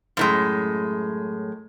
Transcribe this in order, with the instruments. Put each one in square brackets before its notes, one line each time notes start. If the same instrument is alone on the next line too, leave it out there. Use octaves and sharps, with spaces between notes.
[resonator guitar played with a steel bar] F#2 A2 G#3